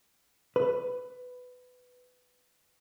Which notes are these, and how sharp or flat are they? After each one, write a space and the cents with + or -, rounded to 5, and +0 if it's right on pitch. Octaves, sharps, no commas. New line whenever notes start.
B4 +15